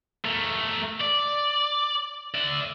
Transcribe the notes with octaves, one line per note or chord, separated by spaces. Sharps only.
A3 A#4
D5
D5 E5